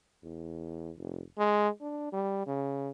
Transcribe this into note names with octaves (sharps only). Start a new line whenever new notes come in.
E2
F1
G#3
D4
G3
C#3